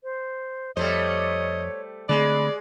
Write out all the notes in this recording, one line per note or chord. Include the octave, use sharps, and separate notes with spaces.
C5
F2 G3 A3 C5 C#5 D#5
D3 G#3 A3 C4 D5 B5